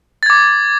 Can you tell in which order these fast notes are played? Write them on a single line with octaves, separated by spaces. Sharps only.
A6 G#6 D6